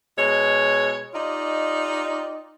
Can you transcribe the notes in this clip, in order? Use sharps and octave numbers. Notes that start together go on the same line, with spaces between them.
B2 G#3 C#5
D#4 F4 G4 D5 D#5